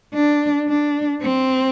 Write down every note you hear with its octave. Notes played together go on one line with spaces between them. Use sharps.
D4
D4
C4